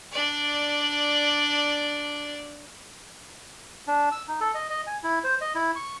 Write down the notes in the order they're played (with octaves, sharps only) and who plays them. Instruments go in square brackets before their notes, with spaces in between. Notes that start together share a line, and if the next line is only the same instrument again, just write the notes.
[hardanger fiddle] D4 D5
[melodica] D4
E6
D#4
A4
D#5
D#5
G#5
E4
C5
D#5
E4
C#6